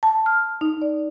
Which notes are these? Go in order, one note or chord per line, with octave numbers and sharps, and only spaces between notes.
A5
F6
D#4
D5